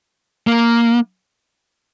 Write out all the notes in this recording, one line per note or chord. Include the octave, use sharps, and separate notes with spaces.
A#3